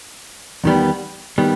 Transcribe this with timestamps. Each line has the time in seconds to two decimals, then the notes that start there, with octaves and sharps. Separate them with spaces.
0.64 E2 D#3 G3 B3
1.38 D#3 G3 B3